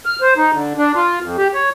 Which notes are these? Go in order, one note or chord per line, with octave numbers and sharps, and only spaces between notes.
F6
C5
D#4
D3
D4
F4
F2
G4
C#5